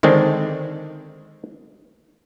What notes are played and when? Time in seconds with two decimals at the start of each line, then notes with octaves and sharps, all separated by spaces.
0.03 D3 D#3 G#3 C4 D4